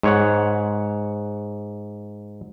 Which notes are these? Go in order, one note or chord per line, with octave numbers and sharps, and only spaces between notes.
G#2 C#5 F#5